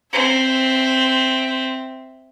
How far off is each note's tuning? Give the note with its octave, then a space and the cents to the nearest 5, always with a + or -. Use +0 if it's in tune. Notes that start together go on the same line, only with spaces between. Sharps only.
C4 +0 E5 +0